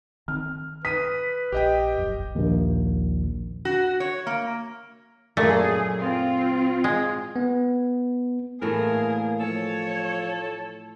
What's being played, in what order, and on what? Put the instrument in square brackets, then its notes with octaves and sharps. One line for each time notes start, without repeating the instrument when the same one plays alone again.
[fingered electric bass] D#3 C4 [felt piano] F6
[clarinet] B4 [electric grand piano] D#6 D#7 [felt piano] B6
[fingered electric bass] A#1 [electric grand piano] G4 D#5 G5
[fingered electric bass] E1 A#1 F#2
[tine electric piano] A#1 D#2
[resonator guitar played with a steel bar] F#4
C#5
A#3
[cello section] F#2 G#4 [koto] A#2 A3
[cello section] C4 F4
[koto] G#3
[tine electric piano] B3
[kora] A2 E3 A3 [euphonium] A#3 [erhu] G#4 [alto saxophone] A#4
[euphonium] F3 [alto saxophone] A4 [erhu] C#5